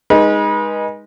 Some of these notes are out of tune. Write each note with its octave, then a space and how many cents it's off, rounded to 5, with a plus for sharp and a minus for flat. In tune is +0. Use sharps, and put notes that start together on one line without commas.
G#3 -10 D#4 +0 B4 -35